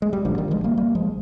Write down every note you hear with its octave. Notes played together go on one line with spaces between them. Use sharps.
G#3
G3
A#1 G#2 D3 F3
D#3 G3
F3 G#3
G3 A#3
G3 A#3
F3 G#3